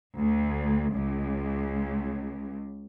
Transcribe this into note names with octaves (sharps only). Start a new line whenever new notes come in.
D2
C#2